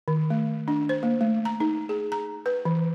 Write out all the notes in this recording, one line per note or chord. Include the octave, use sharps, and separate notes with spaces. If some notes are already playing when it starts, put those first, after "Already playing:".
D#3
A3
D4
C5
A#3
A3
A#5
D#4
G#4
A#5
B4
E3